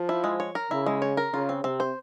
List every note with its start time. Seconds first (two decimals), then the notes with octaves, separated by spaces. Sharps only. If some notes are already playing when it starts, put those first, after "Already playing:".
Already playing: F3
0.09 E4
0.24 G#3
0.40 C#5
0.55 A#4
0.71 C#3 E4
0.86 G#3
1.02 C#5
1.17 A#4
1.33 C#3 F4
1.49 C4
1.64 C3 C4
1.80 C5